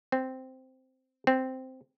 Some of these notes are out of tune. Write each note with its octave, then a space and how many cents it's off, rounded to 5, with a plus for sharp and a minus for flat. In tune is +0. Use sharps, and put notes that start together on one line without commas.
C4 -5
C4 -5